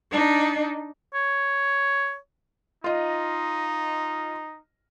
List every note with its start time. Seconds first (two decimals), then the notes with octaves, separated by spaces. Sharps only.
0.12 D4 D#4
1.14 C#5
2.84 D#4 F4 D#5